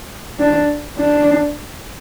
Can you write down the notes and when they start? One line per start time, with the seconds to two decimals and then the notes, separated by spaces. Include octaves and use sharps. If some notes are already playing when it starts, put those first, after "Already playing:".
0.39 D4
0.98 D4